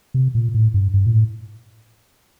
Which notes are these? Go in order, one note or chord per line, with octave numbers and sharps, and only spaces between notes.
C3
A#2
A2
G2
G2
A#2
A2